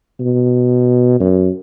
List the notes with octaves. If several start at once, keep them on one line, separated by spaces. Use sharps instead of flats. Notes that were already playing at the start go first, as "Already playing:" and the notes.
B2
F#2